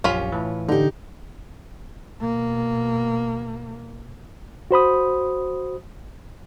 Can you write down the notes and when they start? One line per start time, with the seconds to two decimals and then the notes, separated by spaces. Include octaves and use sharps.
0.04 A#1 F#2 C#4 F4 G4 B5
0.32 A2 E3
0.69 D3 D#4 G4
2.20 B2 A#3
4.71 F#4 C5 B5 D#6